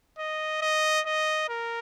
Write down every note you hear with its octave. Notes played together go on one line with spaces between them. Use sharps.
D#5
D#5
D#5
A#4